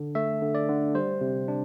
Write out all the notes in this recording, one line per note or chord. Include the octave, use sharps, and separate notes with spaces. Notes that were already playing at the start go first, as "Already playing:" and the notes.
Already playing: D3
A3 E5
D3
D5
D3
G3 C5
C3
D4